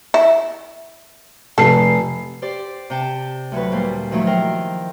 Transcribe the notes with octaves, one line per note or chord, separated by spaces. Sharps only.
E4
F1 A4 C7
G4 C5 D5
C3 G5 A5
D2 F#3 B4
A#2 G3 C5
D#3 F3 F#3 A3 E4
A#4 C5 G5